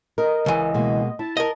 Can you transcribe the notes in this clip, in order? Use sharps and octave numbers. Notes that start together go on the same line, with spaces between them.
A#4 D#5
C#2 E3
B2 G#3 A#3
E4 A5
A#4 D#5